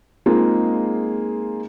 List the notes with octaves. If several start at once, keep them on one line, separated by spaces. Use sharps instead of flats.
G#3 A#3 C4 D#4 F4 G#4